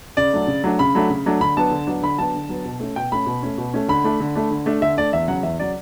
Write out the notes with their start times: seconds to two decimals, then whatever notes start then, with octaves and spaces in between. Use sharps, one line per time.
0.17 C#3 D5
0.33 F#3 A3 D4
0.47 C#3
0.64 F#3 A3 D4
0.79 C#3 B5
0.95 F#3 A3 D4
1.10 C#3
1.26 F#3 A3 D4
1.41 D3 B5
1.57 F#3 B3 D4 A5
1.71 D3
1.87 F#3 B3 D4
2.02 D3 B5
2.18 F#3 B3 D4 A5
2.35 D3
2.49 F#3 B3 D4
2.65 B2
2.80 A3 C#4
2.96 B2 G5
3.12 A3 C#4 B5
3.26 B2
3.43 A3 C#4
3.58 B2
3.74 A3 C#4
3.88 D3 B5
4.04 A3 D4
4.20 D3
4.35 A3 D4
4.51 D3
4.66 A3 D4
4.81 D3 E5
4.97 A3 D4 D5
5.13 E2 E5
5.28 C#3 F#3 F#5
5.43 E2 E5
5.59 C#3 F#3 D5